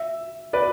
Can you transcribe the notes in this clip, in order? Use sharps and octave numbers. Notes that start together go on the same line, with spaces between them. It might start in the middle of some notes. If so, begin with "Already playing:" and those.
Already playing: E5
B4 D5